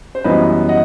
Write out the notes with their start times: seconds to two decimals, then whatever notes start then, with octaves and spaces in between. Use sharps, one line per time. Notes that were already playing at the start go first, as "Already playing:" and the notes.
0.15 C5
0.24 F#2 E3 G3 B3 B4 D#5
0.69 D#5 F#5